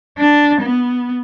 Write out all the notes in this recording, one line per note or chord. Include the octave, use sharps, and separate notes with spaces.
D4
B3